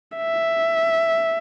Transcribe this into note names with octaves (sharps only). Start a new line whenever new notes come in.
E5